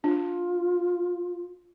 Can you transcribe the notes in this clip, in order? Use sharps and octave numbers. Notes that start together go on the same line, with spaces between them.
D4 F4